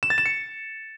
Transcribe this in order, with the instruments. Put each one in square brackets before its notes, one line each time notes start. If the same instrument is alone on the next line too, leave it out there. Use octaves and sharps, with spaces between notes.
[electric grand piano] E7
A6
E7
C#7